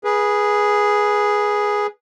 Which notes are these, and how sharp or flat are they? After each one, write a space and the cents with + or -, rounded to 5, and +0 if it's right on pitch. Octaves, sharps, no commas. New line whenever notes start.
G#4 +0 B4 -25